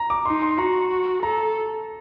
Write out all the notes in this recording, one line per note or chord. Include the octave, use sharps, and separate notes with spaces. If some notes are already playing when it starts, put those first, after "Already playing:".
Already playing: A#5
D6
D#4 C6
C6
F#4 A#5
A4 A#5